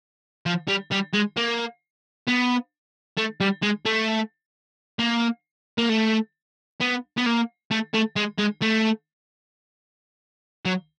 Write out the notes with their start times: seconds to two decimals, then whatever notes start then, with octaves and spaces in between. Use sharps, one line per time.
0.46 F3
0.68 G3
0.92 G3
1.14 G#3
1.37 A#3
2.27 B3
3.18 A3
3.40 G3
3.63 G#3
3.86 A3
4.99 A#3
5.78 A#3
5.89 A3
6.81 B3
7.17 B3
7.26 A#3
7.71 A3
7.94 A3
8.16 G#3
8.39 G#3
8.62 A3
10.65 F#3